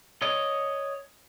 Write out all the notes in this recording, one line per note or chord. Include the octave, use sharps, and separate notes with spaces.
C#5 D#5